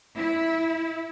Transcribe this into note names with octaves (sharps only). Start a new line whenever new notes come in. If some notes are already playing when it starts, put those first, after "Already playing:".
E4